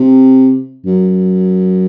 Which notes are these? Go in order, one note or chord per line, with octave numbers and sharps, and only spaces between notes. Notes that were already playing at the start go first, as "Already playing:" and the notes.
Already playing: C3
F#2